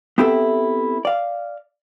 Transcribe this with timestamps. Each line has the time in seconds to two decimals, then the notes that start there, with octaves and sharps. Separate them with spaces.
0.18 B3 C4 E4 G4 A4 E5
1.05 D5 F5